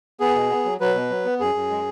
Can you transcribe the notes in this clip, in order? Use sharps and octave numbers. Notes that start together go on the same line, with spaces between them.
B3 G#4
B2
B3
F#3
F#3 B4
B2
F#3
B3
F#2 G#4
F#2
G#3